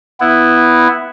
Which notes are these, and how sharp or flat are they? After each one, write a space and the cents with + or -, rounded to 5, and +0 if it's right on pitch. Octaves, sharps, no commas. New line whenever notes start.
B3 +0 E4 +0